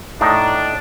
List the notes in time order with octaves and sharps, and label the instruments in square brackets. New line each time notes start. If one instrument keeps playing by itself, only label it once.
[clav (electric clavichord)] A2 D#4 [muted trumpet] D4